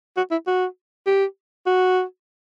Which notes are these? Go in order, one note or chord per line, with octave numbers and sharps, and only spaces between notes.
F#4
E4
F#4
G4
F#4